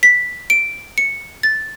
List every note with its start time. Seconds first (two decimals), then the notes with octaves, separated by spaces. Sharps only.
0.03 B6
0.50 D7
0.98 C#7
1.43 A6